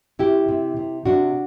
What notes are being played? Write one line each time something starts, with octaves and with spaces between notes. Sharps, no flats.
C3 E4 G4
C3
C3
C3 D4 F#4